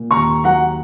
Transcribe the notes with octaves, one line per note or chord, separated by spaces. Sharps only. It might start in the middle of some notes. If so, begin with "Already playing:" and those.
Already playing: A#2
D#2 A#5 C#6
F#3 F#5 A#5